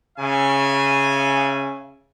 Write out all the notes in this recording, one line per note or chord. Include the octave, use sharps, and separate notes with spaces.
C#3 E5 G#5